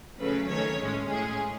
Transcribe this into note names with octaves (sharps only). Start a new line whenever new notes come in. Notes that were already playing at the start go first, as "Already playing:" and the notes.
C#3 F#3 A3 C#4 B4
D#3 A3 C#4 C#5
A2 G#3 C#4
A2 G#3 C#4 G#4